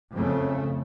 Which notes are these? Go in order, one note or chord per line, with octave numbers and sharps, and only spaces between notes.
F2 C#3 A3